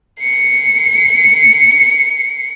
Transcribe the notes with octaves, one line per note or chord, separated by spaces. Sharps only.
C7 C#7